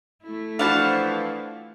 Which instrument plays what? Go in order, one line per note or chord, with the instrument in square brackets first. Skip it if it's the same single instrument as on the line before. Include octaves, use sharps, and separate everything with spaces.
[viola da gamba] A3 E4
[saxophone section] E3 F3 [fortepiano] D4 F#4 B5 [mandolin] F5 F#5 A5